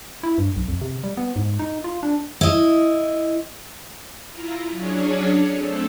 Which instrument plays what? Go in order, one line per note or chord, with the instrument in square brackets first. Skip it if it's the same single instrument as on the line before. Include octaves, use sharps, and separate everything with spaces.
[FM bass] E4
G2
B1
F2
C3
G3
B3
G#2
D#4
F4
D4
[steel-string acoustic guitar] E4 D#5
[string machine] E4 F4 A#5
F#3 C#4 D4 G#4 C#5
A3 C4 A4